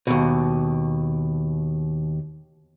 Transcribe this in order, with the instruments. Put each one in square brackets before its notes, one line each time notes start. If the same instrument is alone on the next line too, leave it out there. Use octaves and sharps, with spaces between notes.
[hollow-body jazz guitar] D#2 B2